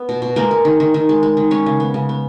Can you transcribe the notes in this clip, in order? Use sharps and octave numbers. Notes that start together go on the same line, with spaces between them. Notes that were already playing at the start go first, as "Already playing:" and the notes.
Already playing: B3
B2
B2
G#3 A#3 A#4
G#3
D#3
D#3
D#3
G#3
G#3
D#3
G#3 C#4 C#5
C#3
B3
C#3
B3